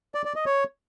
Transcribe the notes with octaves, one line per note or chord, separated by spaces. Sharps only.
D5
D5
D#5
C#5